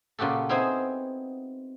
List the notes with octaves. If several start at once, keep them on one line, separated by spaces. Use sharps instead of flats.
A#2 C#3 F#4 G4 A4
B3 C4 D#4 E4 G#4 C5